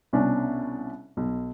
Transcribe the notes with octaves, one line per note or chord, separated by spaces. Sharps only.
C2 B2 C#4 D4
B1